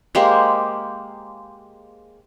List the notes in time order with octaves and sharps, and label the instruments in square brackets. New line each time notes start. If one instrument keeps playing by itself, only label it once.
[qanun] G#3 A#3 G4 C5